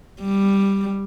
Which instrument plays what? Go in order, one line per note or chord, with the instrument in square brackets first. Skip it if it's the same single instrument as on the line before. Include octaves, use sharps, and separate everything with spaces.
[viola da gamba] G3